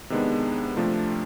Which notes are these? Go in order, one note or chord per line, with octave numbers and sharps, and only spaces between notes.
C3 D#3 G#3 B3 D4
C3 F3 A3 D4 F4